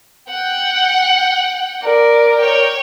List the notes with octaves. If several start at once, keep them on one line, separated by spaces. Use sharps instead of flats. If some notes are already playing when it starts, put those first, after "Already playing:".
F#5 G5
A#4 D5
C#5 G5